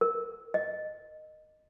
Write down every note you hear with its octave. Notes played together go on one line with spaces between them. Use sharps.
A#4
D#5